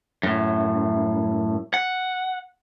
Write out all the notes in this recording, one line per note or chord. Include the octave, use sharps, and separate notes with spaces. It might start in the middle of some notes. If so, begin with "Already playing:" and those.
F#2 A2
F#5